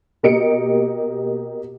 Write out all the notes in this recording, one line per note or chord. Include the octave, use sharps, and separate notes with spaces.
B2 A#3 G4 D#5 C#7 D7